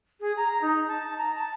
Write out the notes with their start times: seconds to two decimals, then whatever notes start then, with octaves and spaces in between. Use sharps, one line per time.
0.20 G#4
0.37 A#5
0.61 D#4
0.88 A5
1.18 A#5
1.36 A5